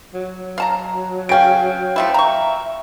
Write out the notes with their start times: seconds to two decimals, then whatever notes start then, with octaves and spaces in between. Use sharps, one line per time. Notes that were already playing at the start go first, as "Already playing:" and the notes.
0.14 F#3
0.58 F5 A5 A#5
1.29 C#3 C#4 F5 G5 D7
1.96 F3 A3 E4 E5
2.14 A#5 C#6